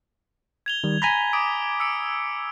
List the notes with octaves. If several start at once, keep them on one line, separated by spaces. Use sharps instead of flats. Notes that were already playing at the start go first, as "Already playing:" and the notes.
G#6 F7 G7
D#3 G3
G#5 A#5 B5 G#6 B6
D6 D#6 D7
E6 C#7 D7